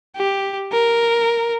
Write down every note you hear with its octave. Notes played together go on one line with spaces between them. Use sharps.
G4
A#4